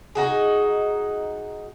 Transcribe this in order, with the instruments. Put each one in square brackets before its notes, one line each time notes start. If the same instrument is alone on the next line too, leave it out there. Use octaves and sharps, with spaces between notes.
[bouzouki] D#4 F#4 G#4